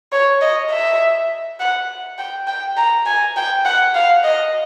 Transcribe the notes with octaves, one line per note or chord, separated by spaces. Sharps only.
C#5
D#5
E5
F#5
G5
G5
A#5
G#5
G5
F#5
F5
D#5